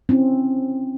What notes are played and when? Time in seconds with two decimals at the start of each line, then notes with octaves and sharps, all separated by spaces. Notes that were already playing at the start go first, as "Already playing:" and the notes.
0.09 C4 C#4 E4